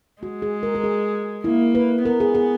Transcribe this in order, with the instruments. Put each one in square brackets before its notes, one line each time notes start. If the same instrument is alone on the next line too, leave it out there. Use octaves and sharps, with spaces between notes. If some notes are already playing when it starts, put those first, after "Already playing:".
[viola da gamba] G#3 [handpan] F#4
[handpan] G#4
A#4
A#4
G#4
[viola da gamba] A#3 [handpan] E4
[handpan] B4
[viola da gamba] B3 [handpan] A#4
[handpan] G#4
G#4